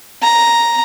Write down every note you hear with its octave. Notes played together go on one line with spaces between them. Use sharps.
A#5